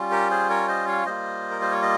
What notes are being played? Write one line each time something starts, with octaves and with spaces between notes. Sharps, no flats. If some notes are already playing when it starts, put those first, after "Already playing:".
Already playing: G3 C#4 F4
G4 A#4
G#4 C5
A#4 C#5
C5 D#5
C#5 F5
G3 A#3 F4 C5 D#5
A#4
C5
C#5
D#5